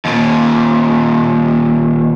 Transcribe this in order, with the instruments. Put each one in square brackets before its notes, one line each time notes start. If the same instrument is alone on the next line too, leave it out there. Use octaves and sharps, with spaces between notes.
[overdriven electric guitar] D#2 A#2